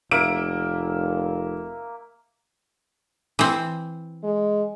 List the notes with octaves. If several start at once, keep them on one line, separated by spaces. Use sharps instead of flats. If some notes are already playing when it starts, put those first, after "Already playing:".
F1 A#3 E5 D7
E3 C4
G#3